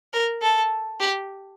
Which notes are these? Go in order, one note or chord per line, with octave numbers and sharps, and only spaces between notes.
A#4
A4
G4